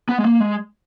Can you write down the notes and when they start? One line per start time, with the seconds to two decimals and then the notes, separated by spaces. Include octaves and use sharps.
0.09 B3
0.18 G#3
0.24 A#3
0.40 G#3